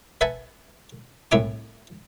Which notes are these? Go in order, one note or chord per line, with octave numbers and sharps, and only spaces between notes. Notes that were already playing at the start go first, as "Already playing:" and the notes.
B4 E5 F#5 G#5 A5 B5
C2 A2 E5 F#5 G#5 D6